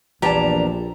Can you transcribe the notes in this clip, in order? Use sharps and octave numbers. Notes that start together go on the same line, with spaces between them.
A#1 E2 G2 G4 A5 A#5